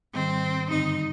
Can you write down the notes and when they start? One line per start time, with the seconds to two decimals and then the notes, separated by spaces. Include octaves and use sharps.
0.14 G#2 D#3 G3 C4
0.71 G2 D3 G3 C4 D#4